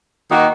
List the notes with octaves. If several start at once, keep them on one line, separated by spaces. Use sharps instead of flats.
D#3 A#3 D#4 F#4